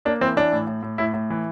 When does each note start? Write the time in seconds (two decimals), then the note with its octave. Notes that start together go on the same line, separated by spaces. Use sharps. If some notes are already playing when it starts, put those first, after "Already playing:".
0.05 A#3 D4
0.21 E3 C4
0.36 E3 D4
0.52 A2
0.67 A2
0.83 A2
0.98 A2 E4
1.14 A2
1.30 E3